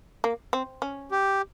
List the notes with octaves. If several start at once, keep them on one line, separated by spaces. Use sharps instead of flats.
A#3
C4
C#4
G4